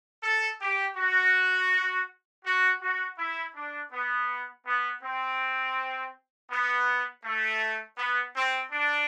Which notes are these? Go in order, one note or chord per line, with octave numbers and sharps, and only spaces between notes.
A4
G4
F#4
F#4
F#4
E4
D4
B3
B3
C4
B3
A3
B3
C4
D4